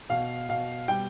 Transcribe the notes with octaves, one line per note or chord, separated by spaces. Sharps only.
B2 F5
B2 F5
G3 G5